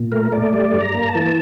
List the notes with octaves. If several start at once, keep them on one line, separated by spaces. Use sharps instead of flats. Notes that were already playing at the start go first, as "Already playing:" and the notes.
Already playing: A#2
A3 A#4
A3 D5
G3 D5
G2
A#5
A#3
A5
E3